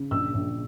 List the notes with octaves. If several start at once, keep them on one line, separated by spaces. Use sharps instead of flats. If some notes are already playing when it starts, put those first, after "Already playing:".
Already playing: C#3
A#1 E6
A#1